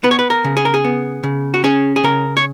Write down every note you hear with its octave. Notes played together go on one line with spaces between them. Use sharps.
B3 B4
C#5
B4
A#4
C#3
G#4
A#4
G#4
B3
C#3
F#4
C#4 G#4
G#4
C#3 A#4
C#5